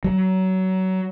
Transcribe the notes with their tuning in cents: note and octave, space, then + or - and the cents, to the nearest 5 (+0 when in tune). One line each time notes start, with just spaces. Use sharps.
F#3 +25